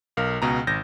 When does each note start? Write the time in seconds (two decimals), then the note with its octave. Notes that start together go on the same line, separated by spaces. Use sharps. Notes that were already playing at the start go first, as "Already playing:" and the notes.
0.17 B1 A#4 F5 F6
0.42 C#2 B2 A#5
0.67 G#1 G6 A#6